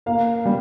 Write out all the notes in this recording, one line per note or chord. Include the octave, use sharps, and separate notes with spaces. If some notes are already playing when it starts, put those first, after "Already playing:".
A#3 F5
G3